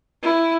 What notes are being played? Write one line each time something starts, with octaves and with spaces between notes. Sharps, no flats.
E4